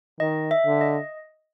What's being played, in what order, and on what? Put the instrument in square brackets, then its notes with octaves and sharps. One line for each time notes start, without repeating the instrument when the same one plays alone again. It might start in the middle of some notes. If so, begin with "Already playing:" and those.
[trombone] D#3 [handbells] D#5
[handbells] E5
[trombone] D3
[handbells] D#5